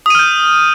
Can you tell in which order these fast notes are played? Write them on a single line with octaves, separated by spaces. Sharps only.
D#6 D#7 F6 G6